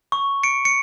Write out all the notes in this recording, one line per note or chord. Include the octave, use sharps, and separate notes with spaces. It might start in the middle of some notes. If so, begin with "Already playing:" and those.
C#6
C#7 D7
C#7